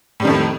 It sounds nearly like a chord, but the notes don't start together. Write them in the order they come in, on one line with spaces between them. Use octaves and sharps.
A2 G3 D#3 F2 A3